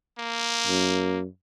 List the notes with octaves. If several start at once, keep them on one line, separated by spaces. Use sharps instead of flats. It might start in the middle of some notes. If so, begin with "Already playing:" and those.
A#3
F#2